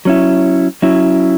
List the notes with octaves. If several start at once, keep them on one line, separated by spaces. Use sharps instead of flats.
F#3 C#4 E4
F#3 C#4 E4